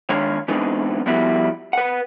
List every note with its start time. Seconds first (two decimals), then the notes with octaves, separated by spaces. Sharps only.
0.09 D#3 G#3 D4 C#5 F5
0.48 E3 G#3 B3 C4 D4 D#4
1.06 F3 G3 B3 E4 F#4
1.73 B4 F#5